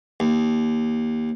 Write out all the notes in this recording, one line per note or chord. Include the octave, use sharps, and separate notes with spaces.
D#2